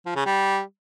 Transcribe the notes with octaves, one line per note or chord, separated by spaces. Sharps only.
F3
C#3
G3